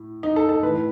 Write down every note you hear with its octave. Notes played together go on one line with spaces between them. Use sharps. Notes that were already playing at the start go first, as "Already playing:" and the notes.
Already playing: A2
D#4
A4
A4
A2 E3 B4